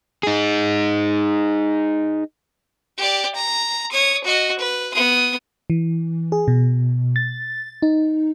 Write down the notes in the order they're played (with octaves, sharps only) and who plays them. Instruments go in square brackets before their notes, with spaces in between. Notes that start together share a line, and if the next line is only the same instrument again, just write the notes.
[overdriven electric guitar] D#4 G#4
[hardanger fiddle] G4 D5
A#5
C#5 D#6
F#4 D#5
B4
B3 D#6
[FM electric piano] E3
G#4
B2
A6
D#4